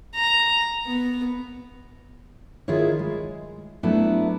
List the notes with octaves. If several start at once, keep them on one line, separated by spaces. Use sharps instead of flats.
A#5
B3
D#3 E4 F4 G#4 C#5
G#3
F#3 A3 B3 D4 E4